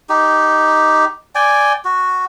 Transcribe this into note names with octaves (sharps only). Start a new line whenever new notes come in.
D#4 G4
D5 G5 G#5
F#4